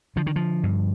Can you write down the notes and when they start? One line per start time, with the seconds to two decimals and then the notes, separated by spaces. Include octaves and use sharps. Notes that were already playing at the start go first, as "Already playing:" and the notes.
0.16 D3 F3
0.27 D#3
0.36 F3
0.63 G2